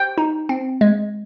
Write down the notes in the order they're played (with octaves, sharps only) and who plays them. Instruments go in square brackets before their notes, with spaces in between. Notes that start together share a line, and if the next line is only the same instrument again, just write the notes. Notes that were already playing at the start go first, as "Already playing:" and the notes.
Already playing: [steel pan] G5
[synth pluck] D#4
C4
G#3